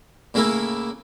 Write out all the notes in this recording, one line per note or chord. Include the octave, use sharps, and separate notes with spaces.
A2 C#3 A3 A#3 E4